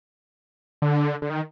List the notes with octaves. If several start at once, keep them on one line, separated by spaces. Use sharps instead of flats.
D3
D3
D#3